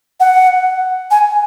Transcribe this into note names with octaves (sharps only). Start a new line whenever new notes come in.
F#5
G#5